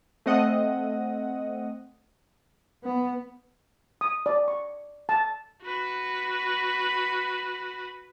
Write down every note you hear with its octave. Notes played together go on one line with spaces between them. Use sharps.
A3 C4 D#5 F#5 D#6
B3
D#6
D5
C#6
A5
F#4 B4